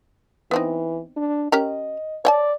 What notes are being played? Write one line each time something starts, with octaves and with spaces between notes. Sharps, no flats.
E3 B3 C4 D#4
D4
C#4 G4 A#4 D#5
C#5 D5 G5 A5